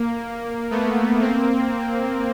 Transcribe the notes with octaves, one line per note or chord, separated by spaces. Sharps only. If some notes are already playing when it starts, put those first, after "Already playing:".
Already playing: A#3
A3 B3
A#3 C4